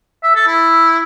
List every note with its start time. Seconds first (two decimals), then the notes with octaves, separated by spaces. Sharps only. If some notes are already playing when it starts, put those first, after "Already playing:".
0.23 E5
0.35 A4
0.47 E4